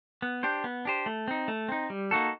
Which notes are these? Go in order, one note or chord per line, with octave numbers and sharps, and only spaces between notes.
B3
D4 G4 C5
B3
D4 G4 C5
A3
C4 D#4
A3
C4 D#4
G3
A#3 D#4 F#4 A4